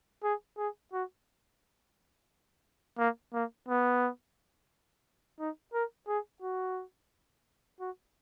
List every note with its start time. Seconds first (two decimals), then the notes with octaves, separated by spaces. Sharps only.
0.23 G#4
0.58 G#4
0.93 F#4
2.98 A#3
3.33 A#3
3.68 B3
5.39 D#4
5.73 A#4
6.08 G#4
6.42 F#4
7.80 F#4